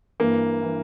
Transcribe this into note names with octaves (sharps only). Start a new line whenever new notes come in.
G2 E3 A#3
E3